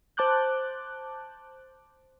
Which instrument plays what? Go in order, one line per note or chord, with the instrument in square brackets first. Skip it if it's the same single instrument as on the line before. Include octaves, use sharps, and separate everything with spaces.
[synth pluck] C5 A5 D6 F#6 G6